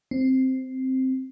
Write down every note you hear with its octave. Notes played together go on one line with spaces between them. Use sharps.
C4